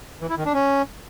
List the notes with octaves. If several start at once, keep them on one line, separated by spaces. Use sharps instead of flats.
E3
E4
D#3
D4
C#4